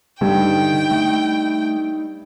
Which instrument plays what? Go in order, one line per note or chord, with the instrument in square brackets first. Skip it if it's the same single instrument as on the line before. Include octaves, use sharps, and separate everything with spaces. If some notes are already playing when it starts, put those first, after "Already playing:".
[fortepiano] G2 [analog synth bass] D3 [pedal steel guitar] D#4 E4 [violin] G5
[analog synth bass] A3